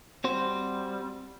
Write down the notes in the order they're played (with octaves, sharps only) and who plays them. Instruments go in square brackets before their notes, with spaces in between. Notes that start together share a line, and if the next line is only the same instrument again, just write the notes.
[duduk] G3 [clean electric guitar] C4 F#4 C5